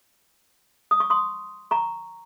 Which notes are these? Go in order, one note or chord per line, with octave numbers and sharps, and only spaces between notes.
D#6
C#6
C6 D#6
A#5 C#6